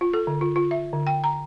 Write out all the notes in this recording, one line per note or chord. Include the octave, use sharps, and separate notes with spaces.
F4
A4
D3
F4
F4
E5
D3
G5
A#5